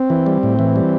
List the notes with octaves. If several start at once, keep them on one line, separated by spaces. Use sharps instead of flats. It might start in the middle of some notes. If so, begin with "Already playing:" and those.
Already playing: C4
E3
G3
A2
E3
G3